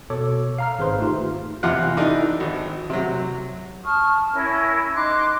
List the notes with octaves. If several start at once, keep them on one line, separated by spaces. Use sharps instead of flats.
B2 A4 C#5 D6
F5 A#5 F6
G#1 G#4 B4 C5 C6
A3 D#4 F4 G4
E2 C3 F4 F#5
E3 D4 D#4
G#1
C3 F#3
A5 C#6 D#6 F6
C#4 E4 A#4
D#4 C6 D6 F#6